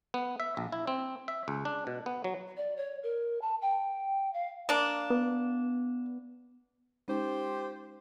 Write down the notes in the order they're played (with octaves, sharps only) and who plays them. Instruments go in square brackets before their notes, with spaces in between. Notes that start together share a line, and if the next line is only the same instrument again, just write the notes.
[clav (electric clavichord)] B3
E5
A#1
E4
C4
E5
C#2
D4
B2
B3
F#3
[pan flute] D5
C#5
A#4
A5
G5
F5
[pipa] A#3 D4
[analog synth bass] B3
[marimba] G#3 C#4 D#4 [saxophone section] F4 G4 C5